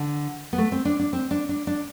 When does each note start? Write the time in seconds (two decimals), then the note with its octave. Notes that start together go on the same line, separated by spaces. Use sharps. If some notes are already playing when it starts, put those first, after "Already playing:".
Already playing: D3
0.53 B3
0.58 A3
0.72 C4
0.85 D4
0.99 D4
1.13 C4
1.31 D4
1.49 D4
1.67 D4